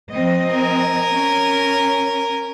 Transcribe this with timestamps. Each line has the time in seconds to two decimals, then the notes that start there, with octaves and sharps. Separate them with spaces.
0.12 F3 C4 D#5
0.51 A#4 G#5
1.10 C#4